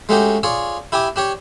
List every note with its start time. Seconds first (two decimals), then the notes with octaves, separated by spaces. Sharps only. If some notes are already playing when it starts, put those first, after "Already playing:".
0.09 G#3 A3 C#4 D#4 F#4 G4
0.43 F4 G#4 C#5 D5
0.92 E4 G4 G#5 D6 D#6
1.16 D4 G4 C#5